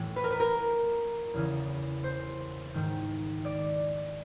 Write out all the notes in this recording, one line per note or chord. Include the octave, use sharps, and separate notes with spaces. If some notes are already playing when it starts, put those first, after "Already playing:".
Already playing: A2 E3
B4
A#4
B4
A#4
E2 C#3 E3
C5
G#2 D#3
D5